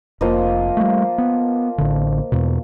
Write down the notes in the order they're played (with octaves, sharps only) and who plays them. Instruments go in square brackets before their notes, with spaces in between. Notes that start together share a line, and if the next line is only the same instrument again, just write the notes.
[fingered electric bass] F1 [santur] F3 A#3 D#5
[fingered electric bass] G3 A3
B3
A1 D3
E2 B2